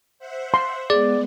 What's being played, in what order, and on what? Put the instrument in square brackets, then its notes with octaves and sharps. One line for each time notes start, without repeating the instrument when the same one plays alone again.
[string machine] C5 E5 F#5
[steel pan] C6
[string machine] G#3 B3 [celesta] G#4 [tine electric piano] D5